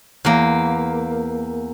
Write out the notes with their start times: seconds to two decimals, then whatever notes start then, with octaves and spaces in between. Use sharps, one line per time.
0.25 E2 A#3